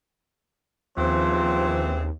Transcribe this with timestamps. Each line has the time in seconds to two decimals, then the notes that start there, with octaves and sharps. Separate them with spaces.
0.97 D#2 C#3 E3 F3 C4 C5